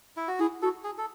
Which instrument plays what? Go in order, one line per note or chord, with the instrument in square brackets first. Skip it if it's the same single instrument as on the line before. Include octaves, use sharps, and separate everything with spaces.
[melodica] E4
F#4
[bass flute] E4 [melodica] G#4
[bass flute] F#4 [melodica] A4
[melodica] G#4
A4